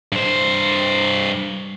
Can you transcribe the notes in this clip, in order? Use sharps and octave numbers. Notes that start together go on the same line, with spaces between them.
G2 C5